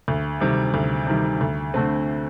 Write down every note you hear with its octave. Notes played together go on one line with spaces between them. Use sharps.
D2
C3 D#3 G3
D2
C3 D#3 G3
D2
D3 A3 C4